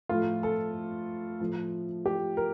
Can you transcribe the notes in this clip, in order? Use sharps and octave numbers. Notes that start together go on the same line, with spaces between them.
A2 F3 F4
A4
A2 F3
G4
A#4